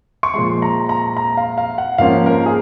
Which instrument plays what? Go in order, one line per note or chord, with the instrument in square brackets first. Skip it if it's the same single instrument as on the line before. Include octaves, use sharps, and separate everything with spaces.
[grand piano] C#6
A#2 F3 G#3 C6
A#5
A#5
A#5
F5
F5
F#5
G#2 F3 A#3 C#4 F5
A#4
G#4